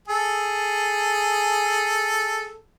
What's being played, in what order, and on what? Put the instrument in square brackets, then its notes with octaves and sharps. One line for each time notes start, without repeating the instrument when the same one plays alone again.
[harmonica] G#4 A4